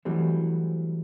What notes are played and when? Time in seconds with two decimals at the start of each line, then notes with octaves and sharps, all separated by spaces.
0.05 E3 F#3 G3 A3 C4